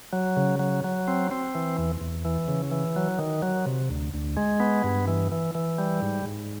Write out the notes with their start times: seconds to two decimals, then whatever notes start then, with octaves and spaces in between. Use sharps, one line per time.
0.13 F#3
0.37 C#3
0.59 F#3
0.84 F#3
1.08 C4
1.31 C4
1.55 E3
1.78 E2
2.01 E2
2.25 E3
2.48 C#3
2.71 E3
2.96 F#3
3.19 D#3
3.42 F#3
3.66 C3
3.90 D2
4.14 D2
4.37 G#3
4.60 B3
4.84 G2
5.08 E3
5.32 E3
5.55 E3
5.78 G3
6.02 G#2
6.26 G#2